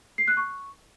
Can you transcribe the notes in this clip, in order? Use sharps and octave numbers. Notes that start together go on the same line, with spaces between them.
C7
F#6
C#6